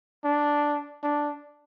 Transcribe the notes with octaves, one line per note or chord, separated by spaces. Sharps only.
D4
D4